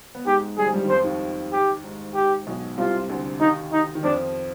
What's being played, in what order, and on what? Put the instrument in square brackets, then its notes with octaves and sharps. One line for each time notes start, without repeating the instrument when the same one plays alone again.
[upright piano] B3
[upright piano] G#2 G#3 [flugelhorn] G4
[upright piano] G3 [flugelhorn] G#4
[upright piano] F3
G2 G3
D#3
[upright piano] F2 F3 [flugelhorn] C5
[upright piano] D#2 D#3
[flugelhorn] G4
[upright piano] G#2
[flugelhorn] G4
[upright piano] B1 B2
[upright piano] C2 C3 [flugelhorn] F4
[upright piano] D2 D3
[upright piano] D#2 D#3 [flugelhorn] D#4
[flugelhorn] D#4
[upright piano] D#3
[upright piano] F2 F3 [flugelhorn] D4